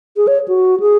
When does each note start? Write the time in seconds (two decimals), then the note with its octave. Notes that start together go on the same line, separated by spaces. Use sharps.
0.17 G#4
0.27 C#5
0.48 F#4
0.80 G#4